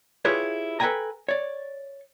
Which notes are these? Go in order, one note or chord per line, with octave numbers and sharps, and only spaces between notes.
E4 F4 G4 G#4 B4 C#5
A4 B4 D5 G5 G#5 A#5
C#5 D5